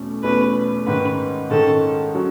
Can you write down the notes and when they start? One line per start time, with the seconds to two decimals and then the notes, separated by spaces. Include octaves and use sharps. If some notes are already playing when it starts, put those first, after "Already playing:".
Already playing: E2 B2 A3 C#4
0.23 E2 B2 A3 C#4 B4
0.87 G#2 D#3 G#3 C#4 B4
1.50 G#2 D#3 G#3 C#4 A4
2.15 F#3 C#4